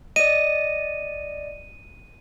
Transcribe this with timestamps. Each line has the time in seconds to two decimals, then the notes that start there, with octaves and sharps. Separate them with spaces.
0.16 D5 D#5 D#7